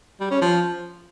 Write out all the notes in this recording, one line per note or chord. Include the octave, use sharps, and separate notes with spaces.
G3
C#4
F3